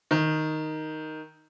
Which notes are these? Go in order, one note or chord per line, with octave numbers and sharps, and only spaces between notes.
D#3